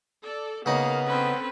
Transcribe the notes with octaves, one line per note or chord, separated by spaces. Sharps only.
A4 D5
C#3 A#3 B3 D#4 F5
C4 C#4 A4 B4